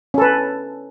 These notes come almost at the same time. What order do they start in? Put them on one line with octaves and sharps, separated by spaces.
C#4 A4 B4